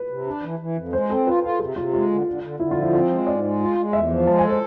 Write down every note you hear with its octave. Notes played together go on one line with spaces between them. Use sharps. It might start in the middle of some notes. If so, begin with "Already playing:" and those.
Already playing: B4
C3
D4
E3
E3
F2
G#3 C5
C4 A4
F4 B4
F4 A4
C3 G#4
C3 F4
G#3 F4
D3
D3
D3
D3 E4
F4
F3
E4
C4 F4
G#3
G#2 D5
G#3
F4
G#3
E2 E5
F3
G#3 A5
G#5
A4
C5